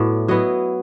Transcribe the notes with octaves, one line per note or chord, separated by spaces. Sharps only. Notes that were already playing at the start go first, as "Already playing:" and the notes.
Already playing: A2 F#3 B3 E4 D5
F#3 B3 E4 D#5